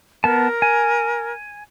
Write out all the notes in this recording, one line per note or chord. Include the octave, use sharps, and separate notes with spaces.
B3 A#4 A5
G#5